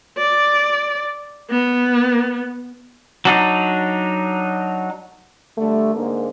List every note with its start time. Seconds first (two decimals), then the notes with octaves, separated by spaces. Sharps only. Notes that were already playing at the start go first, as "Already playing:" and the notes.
0.17 D5
1.50 B3
3.25 F#3 D4 D#4
5.58 D3 G3 A3
5.95 G#2 D3 A#3